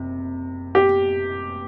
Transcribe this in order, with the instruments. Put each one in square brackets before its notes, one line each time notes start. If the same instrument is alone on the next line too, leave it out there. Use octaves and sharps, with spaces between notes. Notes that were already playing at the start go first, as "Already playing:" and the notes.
Already playing: [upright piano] F#1 C3
G4